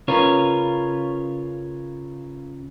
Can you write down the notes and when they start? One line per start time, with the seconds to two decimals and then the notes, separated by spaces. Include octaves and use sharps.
0.08 C#3 C#4 F4 A#4 B4 C#5